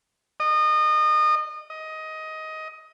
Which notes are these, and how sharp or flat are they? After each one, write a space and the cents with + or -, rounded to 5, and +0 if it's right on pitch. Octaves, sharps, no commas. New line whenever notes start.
D#5 -30
D#5 +15